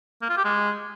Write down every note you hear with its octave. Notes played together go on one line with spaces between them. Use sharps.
A#3
F4
G4
G#3